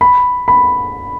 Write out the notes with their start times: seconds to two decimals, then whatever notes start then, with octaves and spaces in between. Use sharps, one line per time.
0.01 B5
0.48 B5